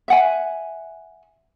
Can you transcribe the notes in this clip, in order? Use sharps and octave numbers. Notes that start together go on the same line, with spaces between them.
E5 F#5 G#5